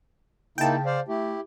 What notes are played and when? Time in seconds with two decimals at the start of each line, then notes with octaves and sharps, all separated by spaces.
0.58 C#3 A#3 D#4 E4 G5 A5
0.86 C5 D5 F5
1.08 A3 E4 G4